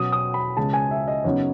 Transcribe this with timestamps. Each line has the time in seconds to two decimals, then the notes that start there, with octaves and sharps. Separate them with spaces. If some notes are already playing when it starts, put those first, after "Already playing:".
Already playing: B2 F#3 C#4 D#6
0.12 D#6
0.34 B5
0.57 C#2 C#3 G#3 A5
0.73 G#5
0.91 E5
1.08 D#5
1.24 F#2 C#3 F#3 B3 D#4 C#5